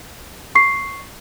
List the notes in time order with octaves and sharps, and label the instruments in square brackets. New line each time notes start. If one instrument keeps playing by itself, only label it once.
[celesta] C#6 C7